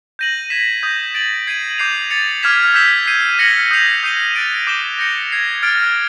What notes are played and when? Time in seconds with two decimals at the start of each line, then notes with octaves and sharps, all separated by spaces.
0.19 G6 A#6 D#7 F#7
0.50 G#6 B6 E7
0.83 D#6 G6 A#6
1.15 A6 D7 F#7
1.47 G#6 C7 D#7 F#7
1.78 D6 G6 C7 F7
2.10 A6 C#7 F7
2.43 D6 F6 G#6 B6 E7
2.74 E6 G6 B6 E7 G7
3.06 G6 C7 D#7
3.39 F6 A#6 C#7 F#7
3.71 D#6 G6 C7 F7
4.03 D#6 G6 C7 D#7 G7
4.34 F#6 A6 D7 F7
4.67 D6 G6 C7 E7 G7
4.99 G6 A#6 C#7 F7
5.31 G#6 C7 F7
5.63 F6 A6 D7